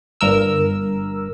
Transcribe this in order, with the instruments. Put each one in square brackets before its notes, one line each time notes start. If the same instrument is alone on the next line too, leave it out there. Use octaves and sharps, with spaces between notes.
[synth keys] G1 G2 A#4 E6